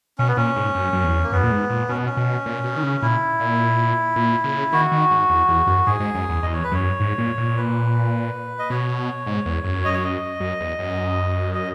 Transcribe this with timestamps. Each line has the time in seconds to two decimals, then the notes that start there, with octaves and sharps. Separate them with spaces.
0.18 B2 C#4
0.28 B3
0.37 A#2 C#4
0.56 G#2
0.75 F#2
0.93 F#2
1.04 E2
1.23 A#3
1.32 F#2 B3
1.43 A#2
1.51 G#2
1.70 A#2
1.89 B2 C#4
1.97 B3
2.05 C#4
2.17 B2
2.46 A#2
2.64 B2
2.76 D#3
2.83 C#3
3.02 A#2 E4
3.40 A#2
4.16 A#2
4.44 C#3
4.73 D#3 F#4
4.92 D#3
5.10 G#2
5.29 E2
5.49 E2
5.67 F#2
5.87 G#2 G#4
6.00 G#2
6.15 F#2
6.29 E2
6.43 E2 D#5
6.53 C#5
6.63 B4
6.72 F#2 C#5
7.00 G#2
7.18 A#2
7.38 A#2
7.57 B4
8.59 D#5
8.70 B2 C#5
9.26 G#2
9.46 E2
9.64 F#2
9.84 D#5
9.93 C#5
10.04 D#5
10.40 F#2
10.60 E2
10.79 F#2
11.54 D#5